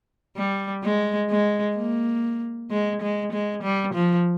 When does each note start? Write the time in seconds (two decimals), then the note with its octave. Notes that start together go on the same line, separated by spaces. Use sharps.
0.37 G3
0.84 G#3
1.30 G#3
1.77 A#3
2.71 G#3
3.02 G#3
3.33 G#3
3.63 G3
3.94 F3